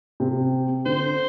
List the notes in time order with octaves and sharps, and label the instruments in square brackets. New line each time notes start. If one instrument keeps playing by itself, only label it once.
[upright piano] C3
[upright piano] D3 [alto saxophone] C5